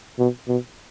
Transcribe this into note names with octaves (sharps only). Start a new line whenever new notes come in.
B2
B2